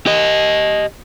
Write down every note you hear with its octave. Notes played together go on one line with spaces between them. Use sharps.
G4 D#5